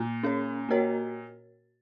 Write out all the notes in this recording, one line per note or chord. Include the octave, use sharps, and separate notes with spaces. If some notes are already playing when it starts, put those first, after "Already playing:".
Already playing: A#2
C#4 G#4 C#5
A#3 F#4 A#4 C#5